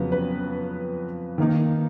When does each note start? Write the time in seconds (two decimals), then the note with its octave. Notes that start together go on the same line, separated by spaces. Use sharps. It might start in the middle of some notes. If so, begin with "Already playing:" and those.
Already playing: F2 C#3 F#3 B3
0.12 B4
1.38 D#3 A#3 D#4